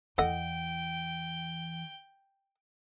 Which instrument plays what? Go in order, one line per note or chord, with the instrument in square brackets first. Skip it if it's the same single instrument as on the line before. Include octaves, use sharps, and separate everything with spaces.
[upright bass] E2 E3 [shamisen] A4 D#5 F#5 [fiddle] G5